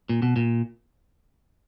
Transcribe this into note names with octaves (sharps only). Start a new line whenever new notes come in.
A#2
B2
A#2